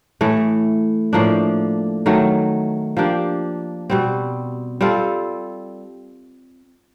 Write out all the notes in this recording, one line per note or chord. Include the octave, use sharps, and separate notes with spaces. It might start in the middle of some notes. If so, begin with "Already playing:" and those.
A2 E3 A3
A2 F3 A#3 D4
D#3 F#3 A3
F3 A#3 D4 G4
B2 G3 C4
G3 C4 F4 A4